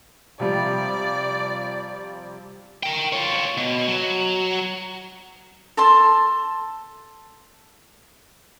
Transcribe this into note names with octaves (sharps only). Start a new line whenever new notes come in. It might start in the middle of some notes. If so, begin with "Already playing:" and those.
C3 F3 G3 D5
A#4 G5
F4 C#5
B2
F#3
A4 A5 C6